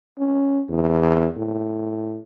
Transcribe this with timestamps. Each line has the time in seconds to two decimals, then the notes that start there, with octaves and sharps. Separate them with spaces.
0.18 C#4
0.69 E2
1.37 A2